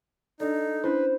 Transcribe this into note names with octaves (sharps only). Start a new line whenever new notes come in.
D4 D#4 A4 D5
C#4 D4 E4 B4 C5